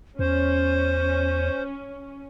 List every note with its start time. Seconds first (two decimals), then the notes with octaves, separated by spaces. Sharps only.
0.19 E2 C#4 C5